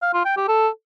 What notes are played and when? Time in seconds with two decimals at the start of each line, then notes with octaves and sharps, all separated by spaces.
0.02 F5
0.14 F4
0.25 G5
0.37 G4
0.48 A4